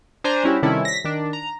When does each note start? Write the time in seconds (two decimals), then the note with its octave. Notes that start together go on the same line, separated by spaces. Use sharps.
0.24 D4 C5 G#5 A#5
0.44 G3 C#4 E4 F#4 G4
0.63 C3 D#3 G3 C#4 E4 A4
0.85 A#6 B6
1.04 D#3 D4
1.33 A#5